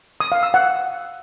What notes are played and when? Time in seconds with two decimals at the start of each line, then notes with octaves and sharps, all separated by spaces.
0.20 D#6
0.32 F5
0.43 E6
0.54 F#5